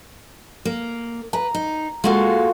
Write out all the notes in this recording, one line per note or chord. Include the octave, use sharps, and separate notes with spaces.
A#3
B4 A#5
D#4
G#3 A#3 F4 F#4 A4